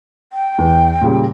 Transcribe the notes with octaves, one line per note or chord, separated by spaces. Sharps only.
G5
E2 E3
A#2 C#3 G3